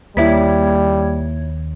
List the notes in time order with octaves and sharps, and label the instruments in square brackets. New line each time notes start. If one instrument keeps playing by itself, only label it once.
[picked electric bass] D#2 [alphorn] G3 [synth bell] A#3 C#5 G#6 [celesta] E4 E5 B6